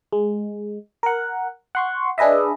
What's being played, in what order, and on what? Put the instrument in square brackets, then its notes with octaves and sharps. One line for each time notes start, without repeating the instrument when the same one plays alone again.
[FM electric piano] G#3
A#4 F#5
F#5 C6 C#6
D4 G#4 B4 D#5 E5